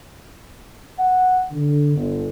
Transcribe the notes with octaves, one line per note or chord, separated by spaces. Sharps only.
F#5
D3
G1